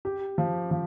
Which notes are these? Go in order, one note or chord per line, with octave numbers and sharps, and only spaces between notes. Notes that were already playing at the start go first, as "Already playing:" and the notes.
G4
F3
F3